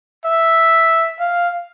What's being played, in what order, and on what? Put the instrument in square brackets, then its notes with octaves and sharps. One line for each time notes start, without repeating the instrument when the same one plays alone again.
[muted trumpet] E5
F5